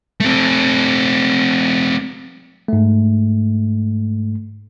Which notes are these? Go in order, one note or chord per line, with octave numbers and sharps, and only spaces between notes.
A3 C4
G#2 A3